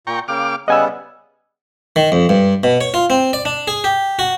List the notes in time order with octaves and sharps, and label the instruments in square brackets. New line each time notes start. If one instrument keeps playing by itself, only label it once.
[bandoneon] A#2 [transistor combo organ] G5 A#5 C#6
[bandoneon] C#3 A#3 G5 [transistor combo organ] D6 F6
[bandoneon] C#3 G3 B3 [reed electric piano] D#5 G#5 E6 [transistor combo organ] F#5
[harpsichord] D#3
F2
G2
B2
C#5
F4
C4
D5
D4
G#4
G4
F#4